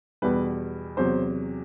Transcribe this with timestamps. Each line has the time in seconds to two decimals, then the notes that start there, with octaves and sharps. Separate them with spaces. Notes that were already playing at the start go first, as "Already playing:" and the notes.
0.22 E2 B2 G3 B4
0.97 E2 C3 F#3 C5